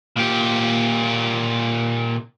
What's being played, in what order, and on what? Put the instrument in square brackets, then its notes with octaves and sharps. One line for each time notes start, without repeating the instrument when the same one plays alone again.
[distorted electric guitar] A#2 G4